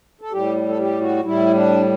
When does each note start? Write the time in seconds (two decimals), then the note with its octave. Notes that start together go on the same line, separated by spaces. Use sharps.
0.21 A4
0.32 A2 G3 G4
0.69 A4
0.79 G4
1.01 F#4
1.24 A2 G3 E4
1.54 D4